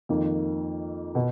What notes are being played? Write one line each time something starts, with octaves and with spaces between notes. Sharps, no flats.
F2 D#3 A#3
B2